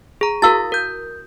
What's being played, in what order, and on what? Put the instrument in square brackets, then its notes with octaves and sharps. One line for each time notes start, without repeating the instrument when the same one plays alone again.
[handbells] G#4 A#5
[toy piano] E4 F#4 E6 [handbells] A#4 F5 A6
[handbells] A#4 G6